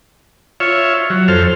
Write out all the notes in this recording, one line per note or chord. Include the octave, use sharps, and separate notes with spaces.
F4 C#5 E5
F#3
F2 A4 C5 F6